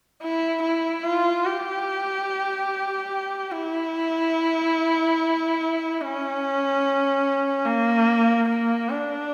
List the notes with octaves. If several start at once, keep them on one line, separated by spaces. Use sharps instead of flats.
E4
E4
F4
G4
E4
C#4
A#3
A#3
D4